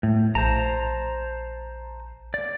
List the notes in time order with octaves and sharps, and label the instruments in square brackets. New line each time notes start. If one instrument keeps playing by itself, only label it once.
[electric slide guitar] A2
[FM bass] A#1 [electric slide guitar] C5 A5 A#5
[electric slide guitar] D5